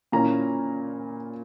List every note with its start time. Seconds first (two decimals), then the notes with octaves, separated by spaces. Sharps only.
0.12 A#2 A#3 C#4 E4 A#5